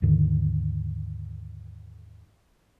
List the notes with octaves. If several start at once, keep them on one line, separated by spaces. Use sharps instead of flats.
D#2 G#2 D3 D#3